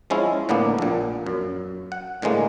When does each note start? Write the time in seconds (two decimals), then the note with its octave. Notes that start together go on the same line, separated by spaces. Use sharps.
0.10 F3 G#3 C#4 E4
0.49 A2 D3 A#3 B3 D4
0.78 A#1 A#2
1.26 F#2
1.92 F#5
2.22 A2 D3 E3 G#3 A#3